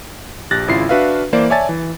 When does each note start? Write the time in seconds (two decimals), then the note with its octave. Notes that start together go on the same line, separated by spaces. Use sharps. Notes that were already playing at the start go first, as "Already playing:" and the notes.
0.51 A#1 G4 F#6 A6 A#6
0.68 G#1 C#3 E4 F4 C7
0.89 D4 F#4 B4 E5 F5
1.33 E3 A#3 C5 D5
1.50 C#5 D5 E5 G#5 A5 A6
1.69 E3